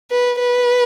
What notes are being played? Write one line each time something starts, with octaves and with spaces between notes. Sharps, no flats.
B4
B4